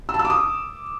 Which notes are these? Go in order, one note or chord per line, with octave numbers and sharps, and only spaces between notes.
E6
A5
E6
D6
D#6